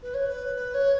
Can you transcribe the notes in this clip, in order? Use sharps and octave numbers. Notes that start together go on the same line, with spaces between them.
B4
C#5
B4
B4
C#5